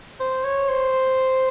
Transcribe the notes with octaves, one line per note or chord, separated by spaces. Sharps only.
C5
C#5
C5